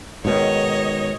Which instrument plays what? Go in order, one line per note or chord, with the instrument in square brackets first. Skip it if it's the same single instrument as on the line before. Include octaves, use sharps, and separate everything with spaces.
[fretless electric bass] G#2 B2 D#3 [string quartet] C#5 D#5